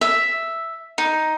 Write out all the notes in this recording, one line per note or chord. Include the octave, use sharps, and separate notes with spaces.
E5
D#4